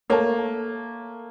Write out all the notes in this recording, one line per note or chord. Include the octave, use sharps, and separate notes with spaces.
A3 A#3 C#5 A5